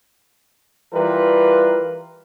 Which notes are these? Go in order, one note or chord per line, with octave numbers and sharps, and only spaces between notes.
E3 G3 F4 A#4 B4